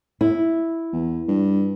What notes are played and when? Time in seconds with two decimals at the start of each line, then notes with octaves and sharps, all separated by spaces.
0.21 E4
0.93 E2
1.28 G2